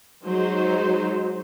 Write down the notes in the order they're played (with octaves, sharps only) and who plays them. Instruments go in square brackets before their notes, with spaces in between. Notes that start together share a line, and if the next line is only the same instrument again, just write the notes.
[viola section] F#3 G#3 D#4 C5